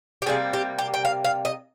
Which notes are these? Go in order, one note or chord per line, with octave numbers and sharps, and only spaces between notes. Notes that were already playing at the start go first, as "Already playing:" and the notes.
G4
C3 G3 A#3 G#4
G4
G4
G5
F5
F5
D#5